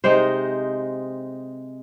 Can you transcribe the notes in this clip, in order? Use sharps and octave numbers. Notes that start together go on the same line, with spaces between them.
C3 G#3 D#4 C5